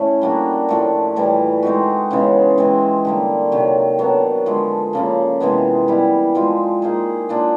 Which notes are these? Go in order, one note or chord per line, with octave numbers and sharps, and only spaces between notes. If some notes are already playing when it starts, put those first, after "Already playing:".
Already playing: A2 A3 C#4 E4 A4
G3 A#3 D4 F#4
A2 F3 A3
A2 E3 G3
G#3 C4 D#4 F#4
C#3 E3 G#3 B3
E3 G#3 C4
D3 G3 A#3
C3 D#3 F#3
D#3 F#3 B3 D4
D3 F3 G#3
C#3 F3 A#3
C3 E3 G#3 B3
G3 B3 E4
F3 G#3 C4 F4
A#3 D#4 G#4
A#3 D4 F4